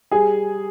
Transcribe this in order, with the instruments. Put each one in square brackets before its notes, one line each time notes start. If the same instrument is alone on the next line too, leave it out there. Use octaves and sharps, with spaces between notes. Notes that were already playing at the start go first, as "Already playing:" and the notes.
[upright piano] G3 G#4 G#5